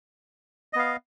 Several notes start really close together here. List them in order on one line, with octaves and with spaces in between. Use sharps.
D#5 B3 F5